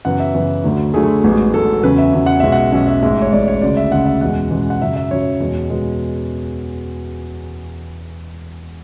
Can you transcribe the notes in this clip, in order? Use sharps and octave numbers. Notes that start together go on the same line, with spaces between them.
F#2 C#3 E3 B3 F#5
E5
F#2 C#3 E3 B3
D2 D3 F#3 A3
D2 D3 F#3 A3 G#4
A1 G#2 F#3 B3
A1 G#2 F#3 B3 A4
E2 C#3 F#3 C#4 B4
E5
E2 C#3 F#3 C#4
F#5
B1 B2 G#3 C#4 E5
F#5
B1 B2 G#3 C#4 E5
E5
A1 G#2 G#3 E5
C#5
A1 G#2 G#3 D5
C#5
D2 C#3 G#3 D5
E5
D2 C#3 G#3 F#5
E5
E2 B2 G#3 C#4 F#5
E2 B2 G#3 C#4
F#5
F#2 C#3 F#3 E5
E5
F#2 C#3 F#3 C#5
E2 B2 G#3 B3
B2 G#3 B3